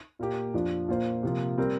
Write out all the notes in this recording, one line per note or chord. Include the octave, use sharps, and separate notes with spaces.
A#2 A#3 G4
F2 F3 D4
A#2 A#3 F4 C5
C3 F3 A#3 F4
G3 C4 A#4